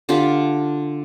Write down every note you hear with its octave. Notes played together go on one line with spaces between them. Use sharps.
D3 D4 F4 G4